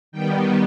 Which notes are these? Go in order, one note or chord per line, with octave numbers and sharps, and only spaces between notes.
D#3 G3 B3 G5